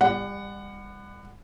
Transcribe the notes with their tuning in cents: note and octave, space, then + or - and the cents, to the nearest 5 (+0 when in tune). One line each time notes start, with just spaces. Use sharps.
G3 +35 D5 +10 F#5 +0